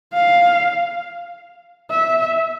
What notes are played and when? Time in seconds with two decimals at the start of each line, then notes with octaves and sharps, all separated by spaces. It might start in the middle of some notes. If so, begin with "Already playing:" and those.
0.13 F5
1.90 E5